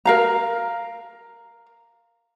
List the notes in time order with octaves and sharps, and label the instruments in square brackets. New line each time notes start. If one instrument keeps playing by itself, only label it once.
[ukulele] A#4 F5 A#5